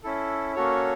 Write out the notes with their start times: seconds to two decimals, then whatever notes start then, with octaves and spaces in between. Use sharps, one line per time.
0.03 C#4 E4 A4
0.55 A#3 C#4 F#4 A4 C#5